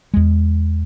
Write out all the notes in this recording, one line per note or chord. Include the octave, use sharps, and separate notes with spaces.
E2 G#3